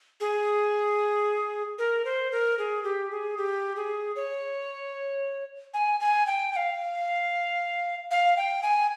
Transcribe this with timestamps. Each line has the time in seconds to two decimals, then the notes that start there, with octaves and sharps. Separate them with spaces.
0.20 G#4
1.78 A#4
2.05 C5
2.31 A#4
2.58 G#4
2.84 G4
3.11 G#4
3.37 G4
3.76 G#4
4.16 C#5
5.74 G#5
6.00 G#5
6.27 G5
6.52 G5
6.56 F5
8.11 F5
8.37 G5
8.63 G#5